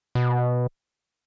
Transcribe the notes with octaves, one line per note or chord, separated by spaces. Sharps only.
B2